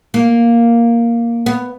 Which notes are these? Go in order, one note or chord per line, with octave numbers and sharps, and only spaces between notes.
A#3
B3